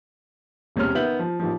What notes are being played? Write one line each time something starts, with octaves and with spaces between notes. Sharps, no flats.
E1 C3 G#3 C#4 C#5 F6
D#3 B3 E5 G6 F#7
F3
A1 D#3 F3